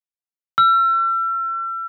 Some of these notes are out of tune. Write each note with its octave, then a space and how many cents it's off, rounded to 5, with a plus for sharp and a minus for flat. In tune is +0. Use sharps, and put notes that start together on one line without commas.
E6 +40